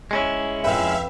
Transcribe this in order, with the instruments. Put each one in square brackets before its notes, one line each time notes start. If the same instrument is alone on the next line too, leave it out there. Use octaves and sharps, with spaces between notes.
[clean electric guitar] G#3 C#4 E4
[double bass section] F2 [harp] B4 G5 [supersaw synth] E5 F5